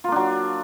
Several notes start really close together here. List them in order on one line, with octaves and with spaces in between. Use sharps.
F4 A#3 D4 F#3